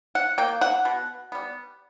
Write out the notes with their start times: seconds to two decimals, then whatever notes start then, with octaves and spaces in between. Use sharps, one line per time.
0.15 F#5
0.38 A#3 G5
0.61 F#5
0.85 B2
1.32 G3 B3